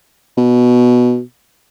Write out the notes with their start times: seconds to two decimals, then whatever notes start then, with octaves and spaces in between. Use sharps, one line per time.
0.37 B2